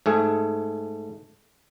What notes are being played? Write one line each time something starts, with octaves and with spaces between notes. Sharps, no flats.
G#2 A3 G#4